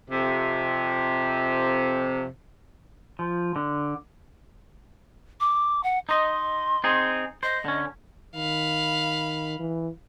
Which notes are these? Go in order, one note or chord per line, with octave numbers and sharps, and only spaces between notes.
F2 C3
F3
D3
D6
F#5
D#4 D#5 C6
C4 D#4 G#4
C5 D#5
D3 C#4
D#3 F5 B5
E3